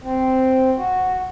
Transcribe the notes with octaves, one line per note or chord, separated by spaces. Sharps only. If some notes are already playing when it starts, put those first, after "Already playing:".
C4
F#4